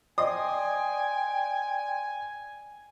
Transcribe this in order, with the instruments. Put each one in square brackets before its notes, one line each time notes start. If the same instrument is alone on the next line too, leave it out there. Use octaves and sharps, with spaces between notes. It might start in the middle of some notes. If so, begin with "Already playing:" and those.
[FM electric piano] D5 C6 [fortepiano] D#5 D#6 [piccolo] G5 [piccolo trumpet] G#5